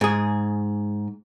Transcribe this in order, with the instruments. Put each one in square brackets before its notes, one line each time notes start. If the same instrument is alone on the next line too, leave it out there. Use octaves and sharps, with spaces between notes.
[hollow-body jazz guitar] G#2 G#4